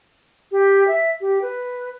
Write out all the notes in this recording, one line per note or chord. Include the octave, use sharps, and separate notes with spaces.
G4
E5
G4
B4